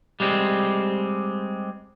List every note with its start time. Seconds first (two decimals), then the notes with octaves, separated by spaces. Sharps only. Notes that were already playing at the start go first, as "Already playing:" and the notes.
0.20 G3 G#3 C4